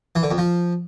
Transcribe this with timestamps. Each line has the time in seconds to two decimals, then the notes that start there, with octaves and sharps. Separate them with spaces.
0.15 E3
0.23 D3
0.31 F2
0.38 F3